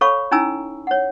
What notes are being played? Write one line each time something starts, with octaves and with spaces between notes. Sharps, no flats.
A4 C#5 F5 B5 C#6
C#4 D#4 E4 G#5 A#5 E6
C#5 F#5